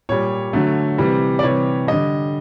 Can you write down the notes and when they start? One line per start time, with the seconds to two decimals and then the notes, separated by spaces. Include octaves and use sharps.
0.09 A#2 G3 C#5
0.53 D3 F#3 A3
0.98 C3 E3 G3
1.39 D5
1.43 C3 E3 G3 C#5
1.87 D3 G3 D#5